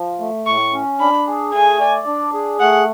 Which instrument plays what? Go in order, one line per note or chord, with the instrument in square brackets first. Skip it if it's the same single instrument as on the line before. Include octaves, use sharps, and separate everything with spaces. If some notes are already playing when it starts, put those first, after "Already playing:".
Already playing: [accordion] F3
A3
[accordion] A2 [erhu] C#6
[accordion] C#4
[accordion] D4 [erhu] B5
[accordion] G#4
[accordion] A3 [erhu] G#5
[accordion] D5
D4
G#4
[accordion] A3 [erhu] F#5